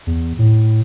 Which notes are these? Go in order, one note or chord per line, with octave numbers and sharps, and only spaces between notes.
E2
A2